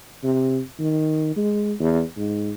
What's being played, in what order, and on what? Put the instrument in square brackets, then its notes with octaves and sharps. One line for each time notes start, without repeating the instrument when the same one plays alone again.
[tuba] C3
D#3
G#3
E2
G#2